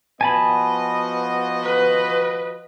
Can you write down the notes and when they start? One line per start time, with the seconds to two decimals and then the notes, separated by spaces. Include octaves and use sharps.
0.21 F3 B3 F#4 D#5 G#5 A5 B5
1.63 B4